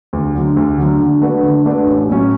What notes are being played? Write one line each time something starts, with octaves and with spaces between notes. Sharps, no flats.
D2
D3 F#3
D2
D3 F#3
D3
A3 D4 F#4 B4
D3
A3 D4 F#4 B4
A1
A2 F#3 C#4